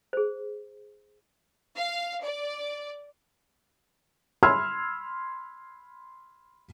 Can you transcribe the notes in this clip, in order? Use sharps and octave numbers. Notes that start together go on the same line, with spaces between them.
G#4 C5
F5
D5
B5 C6 E6 F6 G#6